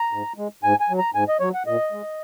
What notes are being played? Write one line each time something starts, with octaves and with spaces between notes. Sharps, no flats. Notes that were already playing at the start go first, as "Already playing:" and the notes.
Already playing: A#5
G#2
G#3
G#2 G#5
G#5
F#3
A#5
G#2 G#5
D#5
F#3 C#5
F#5
A#2 D#5
G#3